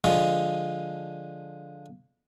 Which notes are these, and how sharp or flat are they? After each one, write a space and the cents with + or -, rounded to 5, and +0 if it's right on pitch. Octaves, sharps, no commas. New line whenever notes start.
D3 -5 F3 +5 G#3 -5